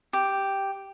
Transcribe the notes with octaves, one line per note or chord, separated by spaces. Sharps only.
G4